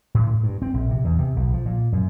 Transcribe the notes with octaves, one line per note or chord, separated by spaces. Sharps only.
A2
G2
C4
A#1
C3
E2
C3
B1
F3
A#2
F#2